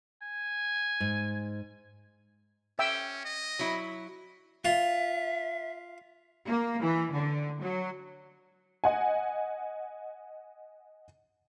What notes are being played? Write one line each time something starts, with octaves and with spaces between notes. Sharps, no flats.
G#5
G#2
C#4 E5 G5 E6
D#5
F#3 E4
F4 E5
A#3
E3
D3
F#3
D#5 F#5 G#5